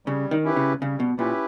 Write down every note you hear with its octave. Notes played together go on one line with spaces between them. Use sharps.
C#3 G3
D#3
C#4 E4 G4 B4
C#3
C#3 G3
B2
A#2 C#4 E4 G4 B4